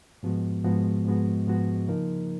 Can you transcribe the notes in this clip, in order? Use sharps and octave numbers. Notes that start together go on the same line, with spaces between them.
G#2 F3 G#3 B3 F#4
G#2 F3 G#3 B3 F#4
G#2 F3 G#3 B3 F#4
G#2 F3 G#3 B3 F#4
C#3 F3 A#3 D#4 A#4